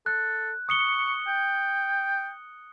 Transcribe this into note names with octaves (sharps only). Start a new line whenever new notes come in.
A4 F#6
C#6 D#6 C#7 G7
G5